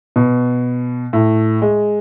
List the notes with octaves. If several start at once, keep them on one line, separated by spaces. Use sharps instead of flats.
B2
A2
G#3